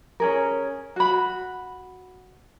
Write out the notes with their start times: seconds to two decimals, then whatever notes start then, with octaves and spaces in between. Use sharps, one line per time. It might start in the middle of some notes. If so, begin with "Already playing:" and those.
0.20 C#4 G#4 A#4
0.96 F#4 B5